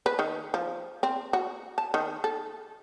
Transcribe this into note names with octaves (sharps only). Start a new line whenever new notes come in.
B4
D#3
F3
C4
F#4
A5
D#3
A4